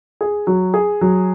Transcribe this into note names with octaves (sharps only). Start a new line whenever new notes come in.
G#4
F#3
G#4
F#3